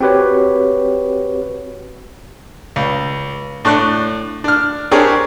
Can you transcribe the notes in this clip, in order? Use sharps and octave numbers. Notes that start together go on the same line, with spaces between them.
C4 F#4 G4 B4 C#5
C#2
A2 D4 C#6 F#6
D4 F6
C4 D4 G4 G#4 A#4 C#5